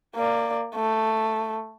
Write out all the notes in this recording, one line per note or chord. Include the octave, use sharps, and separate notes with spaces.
A#3 D5
A3